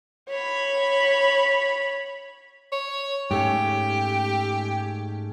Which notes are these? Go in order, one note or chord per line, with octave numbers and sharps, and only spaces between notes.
C#5 B5
C#5
G#2 A3 C#4 G4